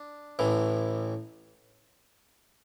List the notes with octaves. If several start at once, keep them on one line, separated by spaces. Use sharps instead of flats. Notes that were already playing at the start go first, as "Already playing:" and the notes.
Already playing: D4
A1 A2 E3